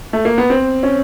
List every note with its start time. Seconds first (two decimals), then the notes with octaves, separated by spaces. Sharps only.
0.13 A3
0.25 A#3
0.38 B3
0.50 C4
0.83 C#4